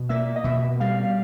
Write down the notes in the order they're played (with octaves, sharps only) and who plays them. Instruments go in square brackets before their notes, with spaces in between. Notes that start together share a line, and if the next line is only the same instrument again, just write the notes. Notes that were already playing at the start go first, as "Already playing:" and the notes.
Already playing: [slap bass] B2
[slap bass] A#3 [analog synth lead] E5
[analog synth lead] D#5
[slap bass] B2 [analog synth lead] E5
[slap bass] G3 [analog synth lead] F5